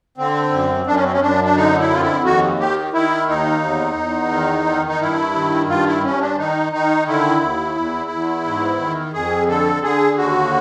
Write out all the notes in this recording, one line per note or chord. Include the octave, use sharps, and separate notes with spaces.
D3 C4
F#2
F#2 D4
C#4
C4
C#4
F#2 D4
D4
D3 D#4
E4
F2 F4
E4
D#2 F#4
D#3 G4
D#3 E4
D#2 D#4
E2
E2
D#3
D#3
D#4
G2 E4
D#3
G2 F4
E4
G2 C#4
D4
D#3 D#4
D#3 D#4
D3 E4
D#2
E2
E2
G#2
D#3
F2 G#4
D3 A4
D3 G#4
D#2 F#4